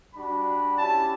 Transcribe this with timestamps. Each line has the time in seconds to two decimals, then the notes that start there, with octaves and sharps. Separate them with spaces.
0.14 G3 D4 F#4 B5
0.77 C#4 E4 G4 A5